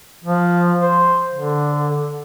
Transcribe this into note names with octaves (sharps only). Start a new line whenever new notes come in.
F3
C5
D3